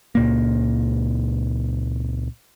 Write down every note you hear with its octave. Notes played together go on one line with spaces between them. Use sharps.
C#2 A#2 A#3